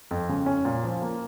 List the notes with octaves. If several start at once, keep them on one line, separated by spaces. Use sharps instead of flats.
F2
C#3
C#4
A#2
F3
A#3